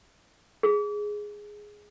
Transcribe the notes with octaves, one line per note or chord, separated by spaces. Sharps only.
G#4